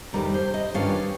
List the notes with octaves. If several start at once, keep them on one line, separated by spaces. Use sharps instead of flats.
F2 C3 D#3 G3 A#4
C5
D#5
G2 D#3 G3 C#4 F4 F5